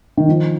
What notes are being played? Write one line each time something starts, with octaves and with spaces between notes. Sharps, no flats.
D#3
F3